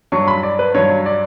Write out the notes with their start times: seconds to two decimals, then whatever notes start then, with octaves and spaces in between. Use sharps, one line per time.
0.12 G2 F#3 C#6
0.28 B5
0.43 D5
0.59 B4
0.74 G2 F#3 C#5
1.06 D5